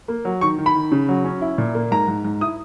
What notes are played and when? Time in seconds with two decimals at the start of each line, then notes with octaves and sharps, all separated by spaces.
0.08 A#3
0.25 F#3
0.41 D#3 C#6
0.58 D#3
0.66 B5
0.75 D#3
0.92 C#3
1.09 F#3
1.25 C#4
1.41 E4
1.58 A#2
1.75 A#3
1.91 G#2 A#5
2.08 G#2
2.24 G#2
2.41 E4 D#6